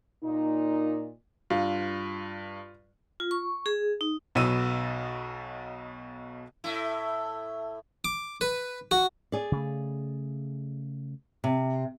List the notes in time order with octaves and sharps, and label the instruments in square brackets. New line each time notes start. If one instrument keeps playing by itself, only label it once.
[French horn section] A#2 D#4
[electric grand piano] G2 [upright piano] F4
[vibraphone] F4
C#6
G#4
D#4
[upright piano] B1 B2 F#3 B3 E6 D#7
[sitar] A2 E4
[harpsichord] D6
B4
F#4
[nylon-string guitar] G#4 D5
[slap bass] C#3 A3
[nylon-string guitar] C3